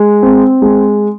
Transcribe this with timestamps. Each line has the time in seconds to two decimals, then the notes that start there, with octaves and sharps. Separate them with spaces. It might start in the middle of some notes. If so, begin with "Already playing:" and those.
Already playing: G#3
0.23 C4
0.62 G#3